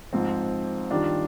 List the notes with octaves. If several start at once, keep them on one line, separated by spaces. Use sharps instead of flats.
G#2 F3 C4
D#3 G3 D4 F4